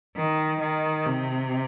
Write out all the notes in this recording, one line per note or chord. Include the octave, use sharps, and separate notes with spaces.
D#3
D#3
C3